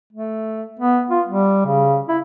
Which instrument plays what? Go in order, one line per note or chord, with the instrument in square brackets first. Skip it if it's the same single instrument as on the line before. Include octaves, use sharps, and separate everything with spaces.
[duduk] A3
B3
F4
G3
C#3
E4